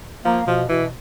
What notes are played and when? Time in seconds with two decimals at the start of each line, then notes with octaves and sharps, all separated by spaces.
0.25 F3 A#3
0.47 B2 F3
0.69 B2 E3